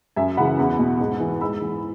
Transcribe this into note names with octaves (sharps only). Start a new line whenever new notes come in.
F#2 E5 G#5
C#3 E3 F#5 B5
E2
B2
G#2
E3
G#2 B5 E6
E3